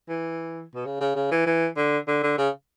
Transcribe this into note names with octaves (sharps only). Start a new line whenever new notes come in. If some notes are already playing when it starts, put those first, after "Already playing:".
E3
B2
C#3
C#3
C#3
E3
E3
D3
D3
D3
C#3